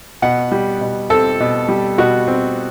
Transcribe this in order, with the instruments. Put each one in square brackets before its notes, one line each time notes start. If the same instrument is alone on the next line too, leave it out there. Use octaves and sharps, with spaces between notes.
[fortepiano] B2 F#5
G3
B2
C4 A4
B2
G3
B2 F#4
C4